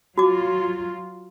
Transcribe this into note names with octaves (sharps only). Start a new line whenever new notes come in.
F#3 F4 F#4 D6